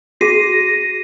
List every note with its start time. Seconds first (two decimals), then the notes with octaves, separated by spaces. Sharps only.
0.21 F#4 G#4 A#6 C7 D#7